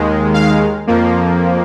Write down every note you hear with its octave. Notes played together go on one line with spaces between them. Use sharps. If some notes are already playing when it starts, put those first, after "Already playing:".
Already playing: D#2 D#3 G#3
F5
F2 F3 A#3